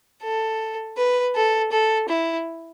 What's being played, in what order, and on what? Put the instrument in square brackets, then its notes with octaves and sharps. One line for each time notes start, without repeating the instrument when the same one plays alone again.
[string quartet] A4
B4
A4
A4
E4